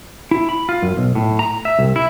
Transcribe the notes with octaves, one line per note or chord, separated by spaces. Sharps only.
E4
B5
F4
F#2
B1
A2
A#5
E5
C2
E4